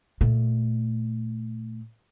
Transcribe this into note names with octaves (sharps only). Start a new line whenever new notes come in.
A#2 A3